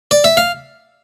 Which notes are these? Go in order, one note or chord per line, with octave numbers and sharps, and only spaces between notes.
D5
E5
F5